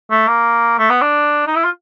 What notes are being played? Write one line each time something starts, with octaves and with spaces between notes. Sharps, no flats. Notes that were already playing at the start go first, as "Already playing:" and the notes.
A3
A#3
A3
B3
D4
D#4
E4
F4